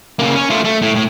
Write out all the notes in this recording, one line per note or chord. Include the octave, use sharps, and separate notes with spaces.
C#3 A#3
C#4
A3 F4
A3
A2
A2